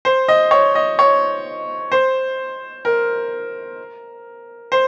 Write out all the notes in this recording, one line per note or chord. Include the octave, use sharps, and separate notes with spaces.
C5
D#5
C#5
D#5
C#5
C5
A#4
C5